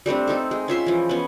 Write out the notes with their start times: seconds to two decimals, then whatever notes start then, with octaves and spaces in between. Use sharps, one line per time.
0.06 G3 A3 C4 D4
0.27 C4 D#4 A4
0.51 G#3
0.68 C#4 F4 E5 C6
0.86 E3 F3
1.09 B3 C#4